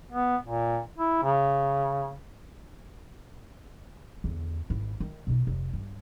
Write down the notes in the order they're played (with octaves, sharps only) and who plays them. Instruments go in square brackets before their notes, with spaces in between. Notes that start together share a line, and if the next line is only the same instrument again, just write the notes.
[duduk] B3
A#2
E4
C#3
[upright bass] E2 D3
G#1 E4
D#3
B2 D#4
F1
G2